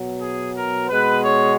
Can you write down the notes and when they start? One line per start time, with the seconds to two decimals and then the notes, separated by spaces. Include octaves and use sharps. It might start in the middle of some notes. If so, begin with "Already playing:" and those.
Already playing: B2 F#3 B3
0.20 G#4
0.55 A#4
0.89 B2 G#3 B3 B4
1.23 C#5